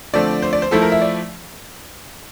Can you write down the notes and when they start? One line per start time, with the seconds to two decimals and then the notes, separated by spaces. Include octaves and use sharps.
0.13 D3 F3 A3 C4 D5
0.42 C5
0.53 D5
0.62 C5
0.71 F3 A3 E4 A4
0.82 A#4
0.92 E5
1.01 D5